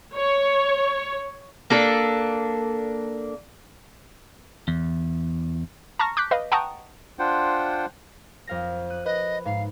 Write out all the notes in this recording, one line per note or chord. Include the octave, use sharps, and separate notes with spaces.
C#5
A#3 D4 A4
E2
A5 A#5 C#6 F6 A#6
D6 F#6 G6 B6
B4 D#5 F5
F#5 G5 A5 A#5 C#6 D#6
D4 F4 C5 F#5 G5
F2 F5 A#6
F#6 D#7
B4 D#5 F#6
G#2 F5